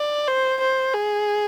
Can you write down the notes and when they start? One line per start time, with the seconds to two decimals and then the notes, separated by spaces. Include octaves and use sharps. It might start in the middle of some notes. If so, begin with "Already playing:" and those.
Already playing: D5
0.27 C5
0.61 C5
0.93 G#4